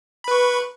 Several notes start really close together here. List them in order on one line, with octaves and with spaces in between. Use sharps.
B5 B4 C#6